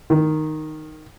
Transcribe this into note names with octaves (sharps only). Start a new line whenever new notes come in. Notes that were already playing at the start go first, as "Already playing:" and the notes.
D#3